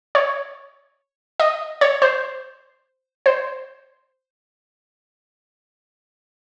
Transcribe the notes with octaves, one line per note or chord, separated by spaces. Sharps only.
C#5
D#5
C#5
C5
C5